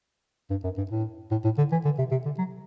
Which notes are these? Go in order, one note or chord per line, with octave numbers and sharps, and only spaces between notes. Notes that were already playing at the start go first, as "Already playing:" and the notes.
G2
F#2
G2
A2
A2
A2
D3
E3
D3
C3
C3
D3
F#3